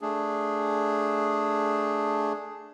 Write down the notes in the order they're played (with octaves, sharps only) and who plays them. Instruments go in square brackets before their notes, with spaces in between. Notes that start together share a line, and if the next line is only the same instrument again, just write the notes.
[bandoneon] A3 D4 G#4